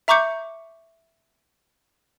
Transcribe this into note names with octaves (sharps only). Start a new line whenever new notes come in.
E5 A#5 C#6 D6 G6 C#7